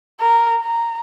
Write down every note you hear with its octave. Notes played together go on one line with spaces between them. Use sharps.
A#4
A#5